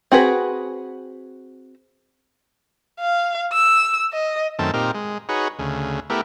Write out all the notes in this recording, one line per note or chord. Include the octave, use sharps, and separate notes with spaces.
C4 F#4 G#4 B4
F5
E6
D#5
F#2 D#3 A3 C4 A5
A#2 C4 D#4 G4 A#4
G#3
D#4 F#4 G#4 B4 C#5
D2 C#3
A3 B3 E4 G4 A#4